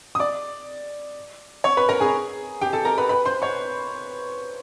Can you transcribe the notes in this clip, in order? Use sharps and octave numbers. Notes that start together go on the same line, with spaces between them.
D#6
D5 D6
C#5 C#6
B4 B5
A#4 A#5
G#4 G#5
G4 G5
A4 A5
A#4 A#5
B4 B5
B4 B5
C5 C6
C#5 C#6